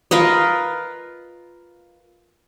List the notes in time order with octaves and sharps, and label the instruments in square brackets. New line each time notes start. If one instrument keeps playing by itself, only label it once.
[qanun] F4 A#4 B4 D#5